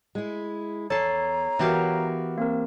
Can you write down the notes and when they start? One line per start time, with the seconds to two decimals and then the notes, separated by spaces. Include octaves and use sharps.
0.15 G#3 E4
0.90 E2 A4 C#5 A5 A#5 C7
1.59 E3 B3 F#4 G4 A#4 F5
2.38 A#3 C4 A#4